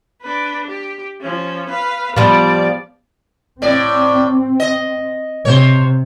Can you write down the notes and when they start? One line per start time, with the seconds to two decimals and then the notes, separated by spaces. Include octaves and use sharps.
0.22 D4 B4
0.68 G4
1.21 F3 C#4
1.70 B4 F5
2.16 F3 G3 B3 D5
3.62 A2 C4 D5
4.60 D#5
5.45 C3 C5 C#5